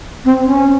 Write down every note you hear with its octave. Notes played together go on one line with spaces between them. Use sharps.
C4
C#4